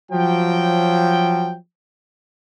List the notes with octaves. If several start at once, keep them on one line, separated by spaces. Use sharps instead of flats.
F3 F#3 G5